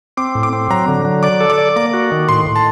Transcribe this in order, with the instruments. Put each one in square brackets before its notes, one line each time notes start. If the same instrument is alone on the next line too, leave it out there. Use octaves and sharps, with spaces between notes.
[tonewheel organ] C4 [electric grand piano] D6
[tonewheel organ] A2
[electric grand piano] D6
[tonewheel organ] C4
[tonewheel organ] F#3 [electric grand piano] A#5
[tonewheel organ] D3
F#3
[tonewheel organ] D5 [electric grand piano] D6
[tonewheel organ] A4
[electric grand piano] D6
[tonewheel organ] D5
[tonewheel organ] A#3 [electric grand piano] D6
[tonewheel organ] F#4
D#3
[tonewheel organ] A2 [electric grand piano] C6
[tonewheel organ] A2
[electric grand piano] A5